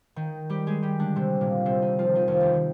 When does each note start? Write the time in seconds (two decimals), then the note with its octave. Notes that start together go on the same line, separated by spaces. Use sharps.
0.16 D#3 D#4
0.50 G3 G4
0.67 G#3 G#4
0.82 G3 G4
1.00 D3 D4
1.16 C3 C4
1.41 A#2 A#3
1.66 C3 C4
1.82 D#3 D#4
1.99 F3 F4
2.15 D#3 D#4
2.28 F2 F3
2.40 D#2 D#3
2.53 D#3